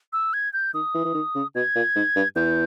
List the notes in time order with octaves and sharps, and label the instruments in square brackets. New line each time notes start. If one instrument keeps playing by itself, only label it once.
[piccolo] E6
G#6
G6
[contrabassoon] D#3 [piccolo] D#6
[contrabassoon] E3
E3
D#3
C#3
[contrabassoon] B2 [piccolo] G#6
[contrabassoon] A#2
G#2
G2
[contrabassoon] E2 [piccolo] G6